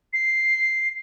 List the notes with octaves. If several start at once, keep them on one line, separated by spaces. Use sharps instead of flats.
C7